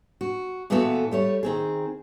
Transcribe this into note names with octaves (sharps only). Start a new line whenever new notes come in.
F#4
A#2 E3 A3 B3 F#4 A4
G3 A3 C#5
D#3 C4 G#4